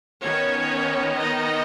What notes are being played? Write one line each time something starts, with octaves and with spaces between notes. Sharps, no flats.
D#3 B3 C#4 C#5
D#4 D#5